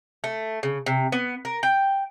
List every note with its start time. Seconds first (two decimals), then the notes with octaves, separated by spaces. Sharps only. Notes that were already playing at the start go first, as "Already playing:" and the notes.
0.24 A3
0.63 C#3
0.86 C3
1.12 B3
1.45 A#4
1.63 G5